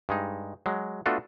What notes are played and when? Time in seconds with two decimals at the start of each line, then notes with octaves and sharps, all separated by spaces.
0.09 G2 G#3 D#4
0.66 F#3 G#3
1.06 A3 B3 D4 F4 F#4 A4